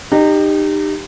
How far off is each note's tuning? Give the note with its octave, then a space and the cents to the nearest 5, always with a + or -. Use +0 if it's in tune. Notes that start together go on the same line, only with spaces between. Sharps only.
D#4 -25 G4 +10